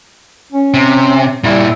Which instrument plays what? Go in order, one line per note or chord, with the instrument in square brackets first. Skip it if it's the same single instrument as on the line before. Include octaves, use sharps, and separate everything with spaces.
[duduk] C#4
[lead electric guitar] C3
[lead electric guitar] A#2 E4 [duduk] G3